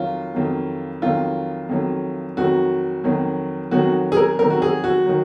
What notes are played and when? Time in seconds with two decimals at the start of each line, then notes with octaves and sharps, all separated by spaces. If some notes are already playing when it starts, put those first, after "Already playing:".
Already playing: F2 D#3 F#3 F4
0.35 F2 D#3 F#3
1.02 F2 D#3 F#3 F4
1.69 F2 D#3 F#3
2.37 F2 D#3 F#3 F#4
3.04 F2 D#3 F#3
3.71 F2 D#3 F#3 F#4
4.12 G#4
4.17 A#4
4.39 F2 D#3 F#3 A#4
4.50 F#4
4.62 G#4
4.84 F#4
5.06 D#3 F#3